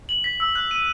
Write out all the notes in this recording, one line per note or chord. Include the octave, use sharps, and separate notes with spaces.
F#7
B6
E6
F#6
D#7